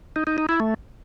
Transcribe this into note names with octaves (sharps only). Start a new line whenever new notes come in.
D#4
D#4
D#4
E4
A3